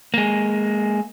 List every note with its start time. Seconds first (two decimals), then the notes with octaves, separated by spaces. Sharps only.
0.14 G#3 A#3